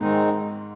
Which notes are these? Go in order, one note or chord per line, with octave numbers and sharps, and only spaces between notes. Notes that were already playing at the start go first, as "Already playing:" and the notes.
G#2 D#3 G#3 C4 D#4